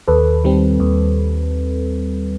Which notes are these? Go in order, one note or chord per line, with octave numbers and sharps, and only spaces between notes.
D#2 A4 B4
D#3 G3 C4
D#2